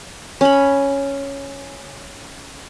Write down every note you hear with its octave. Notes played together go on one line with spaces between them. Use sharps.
C#4 B5